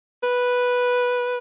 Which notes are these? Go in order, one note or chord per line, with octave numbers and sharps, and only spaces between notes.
B4